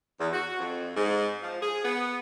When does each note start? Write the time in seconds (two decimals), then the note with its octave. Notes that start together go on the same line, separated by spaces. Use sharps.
0.19 E2
0.32 F#4
0.60 F2
0.96 G#2
1.42 F3
1.62 G#4
1.84 B3